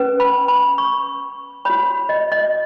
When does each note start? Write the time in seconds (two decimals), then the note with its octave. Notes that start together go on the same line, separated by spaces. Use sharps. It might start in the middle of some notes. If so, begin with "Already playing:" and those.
Already playing: C#4 B4
0.20 B5
0.48 B5
0.78 C#6
1.65 F#4 C#5 B5
2.09 D#5
2.32 D#5